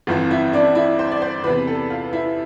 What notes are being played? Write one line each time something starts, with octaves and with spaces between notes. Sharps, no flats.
G1 F2 E3 F4
E4
D4
E4
C5
D5
C5
E2 C3 E3 B4
A4
F4
E4